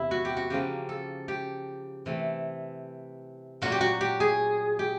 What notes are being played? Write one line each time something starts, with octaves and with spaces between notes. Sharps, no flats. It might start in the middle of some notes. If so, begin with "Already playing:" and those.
Already playing: E2 C3 E4
F#4
G4
F#4
C#3 F3 A#3 G4
A4
G4
C3 E3 A3
A#2 F#3 A#3 F#4
G4
F#4
G4
G#4
G4